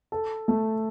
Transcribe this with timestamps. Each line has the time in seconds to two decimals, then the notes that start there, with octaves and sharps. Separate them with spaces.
0.12 A4
0.48 A3